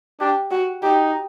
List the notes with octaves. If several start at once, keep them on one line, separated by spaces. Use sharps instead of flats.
D4 G4
F#4
D#4 G4